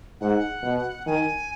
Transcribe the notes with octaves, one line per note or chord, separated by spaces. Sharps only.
G#2 F#5
B2
D#3 G#5